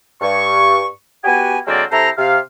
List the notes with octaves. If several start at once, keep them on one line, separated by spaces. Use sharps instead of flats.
G2 C#6
B3 F#4 G4 G#5
D3 F#3 G#3 A#3 C4 D5
C3 E4 A4 C5 A#5
C3 F5